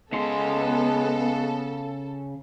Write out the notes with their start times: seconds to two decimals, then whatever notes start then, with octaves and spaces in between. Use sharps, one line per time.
0.13 C#3 G#3 B3 A4 C6